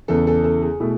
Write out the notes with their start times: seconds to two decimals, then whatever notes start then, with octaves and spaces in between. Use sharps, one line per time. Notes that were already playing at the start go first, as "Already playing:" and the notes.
0.08 E2 C#3 E3 A4
0.27 A4
0.44 A4
0.62 G#4
0.80 B2 A3 E4